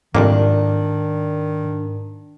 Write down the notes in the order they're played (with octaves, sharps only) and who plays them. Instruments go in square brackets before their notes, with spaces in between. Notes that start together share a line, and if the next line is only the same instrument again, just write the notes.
[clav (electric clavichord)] C2 F2 A#3 [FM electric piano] G#2 [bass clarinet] D#3 [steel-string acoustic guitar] D4